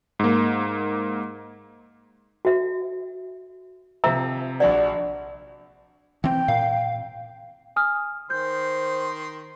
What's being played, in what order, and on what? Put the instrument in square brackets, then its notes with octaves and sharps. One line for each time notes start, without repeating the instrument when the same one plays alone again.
[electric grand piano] G#2 A#3
[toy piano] F#4 E5
[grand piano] C3 F3 [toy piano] E5 A#5 E6
[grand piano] A#1 D4 F#4 [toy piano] D5
[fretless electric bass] E3 C4 [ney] G5
[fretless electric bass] A#2 [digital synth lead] F5
[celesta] G#5 D#6 F6
[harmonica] D#3 C6 [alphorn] C5 [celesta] G6